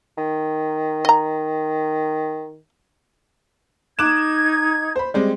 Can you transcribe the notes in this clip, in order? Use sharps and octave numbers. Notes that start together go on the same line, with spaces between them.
D#3
D#5 A#5
D#4 D6 F#6 G#6 E7
C5 B5
G3 G#3 C4